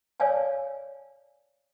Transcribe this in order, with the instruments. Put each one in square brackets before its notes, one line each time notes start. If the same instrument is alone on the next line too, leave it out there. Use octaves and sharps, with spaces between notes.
[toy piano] C#5 D5 F5 G#5 A5